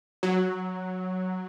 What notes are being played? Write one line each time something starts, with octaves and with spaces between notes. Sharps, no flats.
F#3